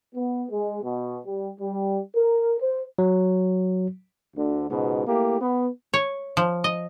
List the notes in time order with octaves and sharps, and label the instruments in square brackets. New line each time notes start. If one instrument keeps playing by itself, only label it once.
[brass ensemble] B3
G#3
B2
G3
G3
A#4
C5
[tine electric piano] F#3
[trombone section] D2 D3
C#2 G#2 B2
A3 A#3 E4 G4
B3
[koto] C#5
F3
D#5